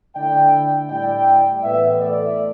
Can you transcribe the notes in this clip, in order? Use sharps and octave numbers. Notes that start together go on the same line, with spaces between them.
D3 A3 E4 D5 G5
A2 G3 E4 D5 G5
A2 E3 B3 B4 E5
A4 D5